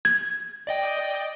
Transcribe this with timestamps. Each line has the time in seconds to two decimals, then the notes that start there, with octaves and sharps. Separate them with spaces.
0.05 G#6
0.67 D5 D#5 G5